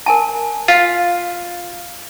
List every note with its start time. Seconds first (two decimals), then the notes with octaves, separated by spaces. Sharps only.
0.06 A#4 G#5 A5
0.68 F4 F5